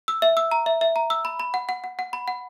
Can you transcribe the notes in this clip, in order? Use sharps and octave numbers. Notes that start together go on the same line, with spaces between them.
E6
E5
E6
A#5
E5
E5
A#5
E6
B5
B5
F#5
F#5
F#5
F#5
B5
F#5